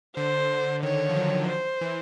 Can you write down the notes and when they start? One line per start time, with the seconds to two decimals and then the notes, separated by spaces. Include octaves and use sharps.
0.16 D3 C5
0.83 D#3 C#5
1.09 F3
1.16 F#3
1.49 C5
1.81 E3